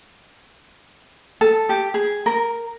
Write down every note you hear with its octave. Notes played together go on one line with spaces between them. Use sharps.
A4
G4
G#4
A#4